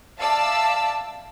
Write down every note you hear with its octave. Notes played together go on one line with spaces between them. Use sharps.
D5 E5 F5 A5 E6